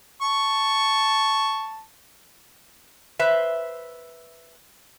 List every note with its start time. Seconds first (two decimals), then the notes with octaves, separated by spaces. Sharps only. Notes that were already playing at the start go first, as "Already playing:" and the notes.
0.22 A5 C#6
3.19 B4 C5 E5